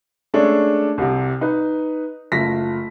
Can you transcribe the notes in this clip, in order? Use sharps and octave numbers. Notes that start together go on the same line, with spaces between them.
G#3 A3 C#4 D4 A4
C2 C3
D#4 B4
F#1 A3 F4 A#6 B6